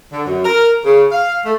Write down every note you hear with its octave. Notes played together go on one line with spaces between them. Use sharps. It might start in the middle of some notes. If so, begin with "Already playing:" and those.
D3
F#2
A#4
C#3
F5
A3